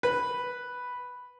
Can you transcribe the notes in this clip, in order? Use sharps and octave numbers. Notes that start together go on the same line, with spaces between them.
B4